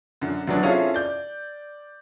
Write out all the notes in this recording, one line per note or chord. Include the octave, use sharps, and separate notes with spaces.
F#2 D3
D2 D3 F#3 B3 D4
C4 C#4 E4 F4 G#4 A4
D5 G6